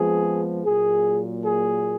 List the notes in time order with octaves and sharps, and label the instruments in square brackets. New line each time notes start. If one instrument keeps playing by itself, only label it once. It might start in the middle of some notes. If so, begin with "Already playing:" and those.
Already playing: [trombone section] F2 F3 G#3 B3 G#4
A#2 F#3 A#3 G#4
G#4